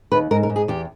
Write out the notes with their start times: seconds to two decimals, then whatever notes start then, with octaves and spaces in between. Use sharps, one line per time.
0.12 D#2 B4
0.31 G#2 A#4
0.43 A#4
0.50 G#2
0.56 G#4
0.68 E2 G4